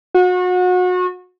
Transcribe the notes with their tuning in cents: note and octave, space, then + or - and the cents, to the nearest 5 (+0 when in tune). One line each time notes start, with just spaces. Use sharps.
F#4 -30